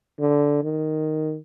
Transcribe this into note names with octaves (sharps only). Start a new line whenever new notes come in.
D3
D#3